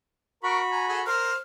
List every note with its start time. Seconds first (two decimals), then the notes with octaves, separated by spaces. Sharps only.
0.43 F#4 A#4 A#5 B5 C#6
0.71 G#5 A#5
0.88 G#4 A4 F#5
1.07 A#4 C5 F6